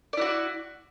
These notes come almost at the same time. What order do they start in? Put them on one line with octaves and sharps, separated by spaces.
D5 E4 F#4